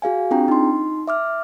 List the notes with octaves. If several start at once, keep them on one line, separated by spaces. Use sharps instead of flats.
F#4 G#4 F5 G#5
C4 D4 F4 G#4 G5 A#5
D#4 C6
E5 D6 F6